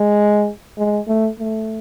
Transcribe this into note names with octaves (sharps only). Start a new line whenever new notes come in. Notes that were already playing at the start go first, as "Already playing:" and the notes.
Already playing: G#3
G#3
A3
A3